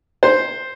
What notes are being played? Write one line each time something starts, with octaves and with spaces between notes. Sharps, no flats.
C5